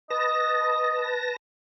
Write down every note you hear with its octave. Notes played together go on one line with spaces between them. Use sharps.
B4 D#5 A5 A#6